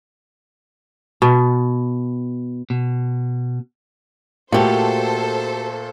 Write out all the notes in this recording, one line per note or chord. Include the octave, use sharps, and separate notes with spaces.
B2
B2
A#2 A3 F#4 G4 A4 C5